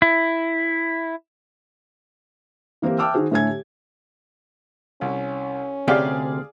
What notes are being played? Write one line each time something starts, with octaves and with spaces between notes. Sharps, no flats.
E4
E3 A#3 C4 G4 A#4
E5 G5 A5 D6 E6 F6
D#3 D#4 F#4 G#4 C5
A2 D3 A3 A4 G#5 G#6
G4
C2 C#4
D2 C3 G4 G#4 D5 F5